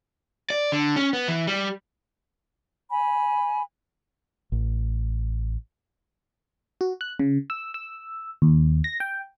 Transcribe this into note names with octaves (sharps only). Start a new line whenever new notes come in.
D5
D3
C#4
B3
E3
G3
G#5 B5
A1
F#4
F#6
C#3
E6
E6
D#2
A#6
G5